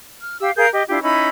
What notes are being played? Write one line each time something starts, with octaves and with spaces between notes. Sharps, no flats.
F6
G4 F5 E6
G#4 A#4 F5 G6
G4 D#5
D4 E4 F4 G4
C#4 D#4 E4 B5